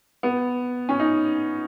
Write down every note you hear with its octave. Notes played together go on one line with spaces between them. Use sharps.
B3
C#4
D#4